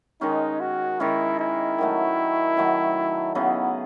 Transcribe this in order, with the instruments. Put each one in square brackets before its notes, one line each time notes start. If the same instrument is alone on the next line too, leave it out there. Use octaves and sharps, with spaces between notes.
[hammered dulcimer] D#3 G#3 C#4 [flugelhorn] D#4
[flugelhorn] F#4
[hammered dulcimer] D#3 G#3 C#4 [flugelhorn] E4
[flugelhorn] E4
[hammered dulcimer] D#3 F#3 A3
D#3 F#3 A3
[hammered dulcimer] C#3 F#3 B3 D#4 [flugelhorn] E4